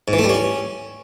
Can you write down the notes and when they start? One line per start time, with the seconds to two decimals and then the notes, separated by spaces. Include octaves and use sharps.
0.08 G#2
0.13 E3
0.19 A3
0.24 G3
0.29 C#4